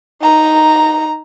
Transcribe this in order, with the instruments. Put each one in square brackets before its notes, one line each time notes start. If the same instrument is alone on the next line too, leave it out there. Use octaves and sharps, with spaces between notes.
[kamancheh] D#4 A#5